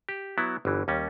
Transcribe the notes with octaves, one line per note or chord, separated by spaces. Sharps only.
G4
F#3 B3 E4
G1 E3
D#2 G3 C#4